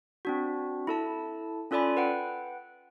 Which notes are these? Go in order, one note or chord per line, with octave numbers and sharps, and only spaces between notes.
C4 D4 F#4
E4 A4 A5
C#4 F4 A4 D5 G#5 B5
B4 F#5 G5